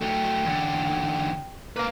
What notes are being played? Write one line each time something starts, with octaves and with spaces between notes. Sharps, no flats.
F#3 A3 G5
E2 D3
A#3 B4 F5